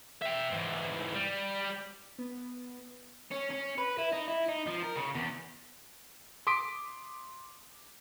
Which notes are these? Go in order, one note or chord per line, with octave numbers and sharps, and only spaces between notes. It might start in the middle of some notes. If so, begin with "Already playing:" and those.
E5 G5
G#2 E3
G3
B3
C#4
C#4
B4
E4
D#4
E4
D#4
F3
A#4
C#3
E2
C6 D6 D#6 B6 D7